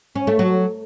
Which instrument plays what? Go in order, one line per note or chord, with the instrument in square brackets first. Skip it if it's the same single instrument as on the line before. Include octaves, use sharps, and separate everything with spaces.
[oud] C#4
A3
F#3